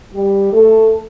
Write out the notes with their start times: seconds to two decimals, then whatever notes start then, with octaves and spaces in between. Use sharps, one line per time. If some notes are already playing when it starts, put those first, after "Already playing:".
0.14 G3 G4
0.53 A3 A4